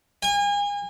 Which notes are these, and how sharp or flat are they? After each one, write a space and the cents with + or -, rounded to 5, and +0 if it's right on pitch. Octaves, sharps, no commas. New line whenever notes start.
G#5 -35